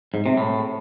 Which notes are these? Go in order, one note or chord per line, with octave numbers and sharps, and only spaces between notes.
G#2
C3
A2